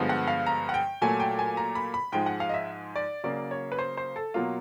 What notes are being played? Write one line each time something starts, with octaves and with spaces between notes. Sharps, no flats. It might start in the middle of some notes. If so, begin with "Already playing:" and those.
Already playing: G2 D3 F3 G#3 B3
F#5
F5
A#5
F#5
G5
A#2 F#3 A3 G#5
G5
G#5
A#5
B5
B5
G#2 F3 G#3 G5
F#5
F5
D#5
E5
D5
C#3 F#3 A#3 D5
C#5
B4
C5
C5
A4
B2 F#3 A#3 F4